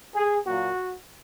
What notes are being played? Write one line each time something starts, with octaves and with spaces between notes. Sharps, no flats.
G#4
A#2 F#3 A#3 F#4